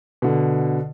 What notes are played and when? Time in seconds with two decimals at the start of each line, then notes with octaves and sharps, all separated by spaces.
0.22 B2 D3